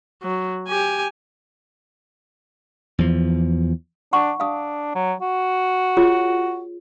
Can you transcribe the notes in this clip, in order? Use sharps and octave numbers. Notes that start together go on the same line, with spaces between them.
F#3
G4 G#5
E2 F3
D4 F#5 C#6
D4 F5 D#6
F#3
F#4
F4 G#4 C#5